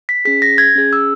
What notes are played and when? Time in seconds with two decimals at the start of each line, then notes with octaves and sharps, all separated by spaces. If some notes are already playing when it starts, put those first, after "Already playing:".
0.09 B6
0.25 C#4 G#4 B6
0.42 A#6
0.58 G#6
0.75 C#4 G#4
0.93 E6